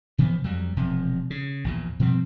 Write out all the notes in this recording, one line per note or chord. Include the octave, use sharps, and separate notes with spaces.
C3 E3 F3 B3
F2 F#3 G3
E1 C3 F3
C#3
A#1 E2 A#2
B2 F3 G3 C4